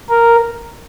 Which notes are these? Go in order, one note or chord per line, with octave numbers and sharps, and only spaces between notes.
A#4